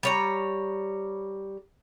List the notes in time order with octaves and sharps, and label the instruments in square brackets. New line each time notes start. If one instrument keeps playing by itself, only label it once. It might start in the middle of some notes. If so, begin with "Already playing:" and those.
[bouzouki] G3 C#5 A#5